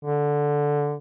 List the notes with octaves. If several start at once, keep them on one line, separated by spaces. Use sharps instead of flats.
D3